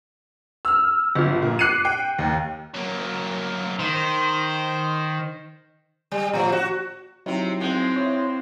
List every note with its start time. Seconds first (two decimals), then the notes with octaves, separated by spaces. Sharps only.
0.65 E6 F6
1.15 G1 F3
1.42 A#2
1.59 D6 F#6 C7 C#7 D#7
1.85 G5
2.19 D#2
2.74 F#3 A#3
3.79 D#3 C5
6.11 G3
6.33 A2 F3
6.52 F#4
7.26 C3 F#3 C4 D#4 E4
7.60 F3 G#3 C4
7.96 E4 C#5